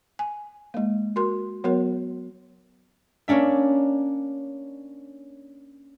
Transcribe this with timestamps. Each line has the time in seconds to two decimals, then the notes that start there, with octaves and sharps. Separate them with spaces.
0.19 G#5
0.74 G#3 A#3
1.16 F#4 A#4 C6
1.64 F#3 B3 F#4 A#4 C#5
3.28 A#3 C#4 D4 E5